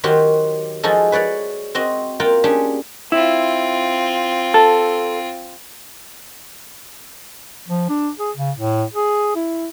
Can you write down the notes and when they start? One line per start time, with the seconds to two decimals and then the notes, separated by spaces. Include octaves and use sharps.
0.04 D#3 F#3 F#4 G4 C5 C6
0.83 F3 G#3 D#4 F#4 G#4 A4
1.12 B4 C#5 D5 F#5
1.75 C4 F#4 D#5
2.20 A#3 F4 F#5 G5 A#5
2.44 C#4 D4 G4 G#4
3.12 C4 E4 F4
4.54 A4
7.68 F3
7.89 D4
8.19 G#4
8.37 C#3
8.58 A2
8.94 G#4
9.36 E4